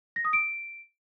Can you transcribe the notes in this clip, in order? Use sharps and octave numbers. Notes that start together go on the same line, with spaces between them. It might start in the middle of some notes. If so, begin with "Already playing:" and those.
A#6
D#6
D7